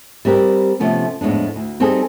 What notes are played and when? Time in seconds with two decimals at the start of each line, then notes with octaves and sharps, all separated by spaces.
0.25 G3 C4 G4 A#4 B4
0.80 C3 F3 A3 B3 C#4
1.21 F2 A2 G#3 B3 D4
1.56 D2
1.80 G3 C4 D#4 G#4 A4 G#5